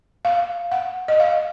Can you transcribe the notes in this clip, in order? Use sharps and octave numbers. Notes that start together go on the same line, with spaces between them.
F5
F#5
D#5
F5